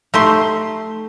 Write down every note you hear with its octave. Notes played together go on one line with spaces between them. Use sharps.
A3 D#4 G4 C6